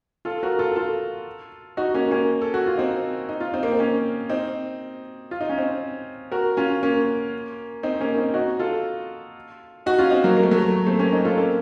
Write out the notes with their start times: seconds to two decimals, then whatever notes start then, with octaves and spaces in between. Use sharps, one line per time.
0.25 F4 A4
0.43 F#4 A#4
0.59 F4 A4
0.76 F4 A4
1.77 D#4 F#4
1.94 A#3 C#4
2.11 A#3 C#4
2.42 A4
2.54 F#4
2.67 F4
2.78 C4 D#4
3.29 D#4
3.40 F4
3.54 C4 D#4
3.63 A#3
3.72 C4
3.79 A#3 C#4
4.29 C4 D#4
5.31 F4
5.41 D#4
5.49 C#4
5.58 C4 D#4
6.32 F#4 A#4
6.57 C#4 F4
6.83 A#3 C#4
7.83 C4 D#4
8.01 A#3 C#4
8.17 C4 D#4
8.34 D#4 F#4
8.59 F4 A4
9.86 D#4 F#4
9.98 C#4 F4
10.11 C4 D#4
10.24 F#3 A#3
10.37 A#3
10.43 A3
10.51 F#3
10.58 A3
10.87 A3 C4
10.99 A#3 C#4
11.12 C4 D#4
11.25 F4 A4
11.38 A#3 C#4